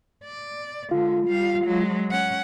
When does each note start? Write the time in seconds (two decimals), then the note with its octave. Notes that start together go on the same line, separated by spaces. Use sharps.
0.24 D5
0.91 D3 G#3 F4
1.26 G3 F5
1.65 F#3 G#3
2.11 C#4 F#5